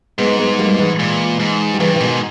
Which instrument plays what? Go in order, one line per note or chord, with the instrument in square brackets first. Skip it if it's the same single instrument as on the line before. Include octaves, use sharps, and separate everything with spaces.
[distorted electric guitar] G#2 [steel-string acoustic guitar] G#3 B3
[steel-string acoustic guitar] G#3 B3
G3 A#3
E3 G#3
[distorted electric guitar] A#2
G#2
[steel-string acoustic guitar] G3
[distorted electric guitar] G2 [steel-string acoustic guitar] C#3 E3
[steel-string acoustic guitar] E3
[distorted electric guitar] G#2 [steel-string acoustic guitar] B2 D#3